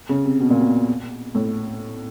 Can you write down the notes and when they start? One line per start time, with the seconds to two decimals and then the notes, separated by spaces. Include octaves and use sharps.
0.09 C#3
0.25 C3
0.40 B2
0.50 A#2
0.60 B2
1.35 A2